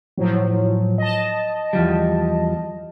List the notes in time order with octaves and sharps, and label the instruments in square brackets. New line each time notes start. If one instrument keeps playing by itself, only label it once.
[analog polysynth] A2 F3 F#3
D#5 A5
[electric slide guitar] E2 F3 G3